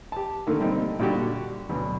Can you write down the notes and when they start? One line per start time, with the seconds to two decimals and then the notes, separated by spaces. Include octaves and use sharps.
0.12 G4 A5
0.47 D3 D#3 A3 A#3
0.60 D3 G3 A#3 C4 D#4
1.00 A#2 D3 G3 F#4 G4
1.19 D3 F#4
1.69 D2 B2 F#3